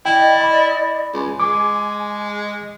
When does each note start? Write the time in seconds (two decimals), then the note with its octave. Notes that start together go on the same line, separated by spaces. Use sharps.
0.06 E4 D5 D#5 G5
0.41 B5
1.14 C#2 G#5
1.40 G#3 D6